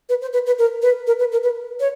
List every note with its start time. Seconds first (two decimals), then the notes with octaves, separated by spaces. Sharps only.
0.09 B4
0.21 C5
0.33 B4
0.46 B4
0.58 A#4
0.82 B4
1.07 A#4
1.19 B4
1.31 A#4
1.43 B4
1.80 C#5